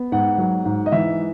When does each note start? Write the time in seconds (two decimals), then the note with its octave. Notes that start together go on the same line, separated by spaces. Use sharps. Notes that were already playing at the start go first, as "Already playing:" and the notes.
Already playing: B3
0.12 G#2 F#5
0.38 F#3
0.65 G#2
0.86 D#5
0.92 E3 E5